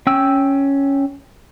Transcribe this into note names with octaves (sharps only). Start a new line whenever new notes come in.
C#4 G5 E6